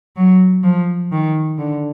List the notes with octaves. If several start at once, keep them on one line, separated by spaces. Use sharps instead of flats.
F#3
F3
D#3
D3